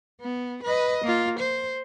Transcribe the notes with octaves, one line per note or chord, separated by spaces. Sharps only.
B3
B4 D#5
A#3 F4
C5